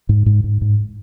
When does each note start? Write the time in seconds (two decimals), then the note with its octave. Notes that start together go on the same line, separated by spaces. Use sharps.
0.09 G#2
0.26 G#2
0.44 G#2
0.61 G#2